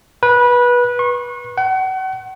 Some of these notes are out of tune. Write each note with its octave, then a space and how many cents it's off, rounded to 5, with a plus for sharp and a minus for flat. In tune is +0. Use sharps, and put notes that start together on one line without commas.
B4 -20
C#6 -40
F#5 +35